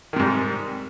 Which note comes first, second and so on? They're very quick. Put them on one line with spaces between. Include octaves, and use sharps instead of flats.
D#3 C3 G#2 G3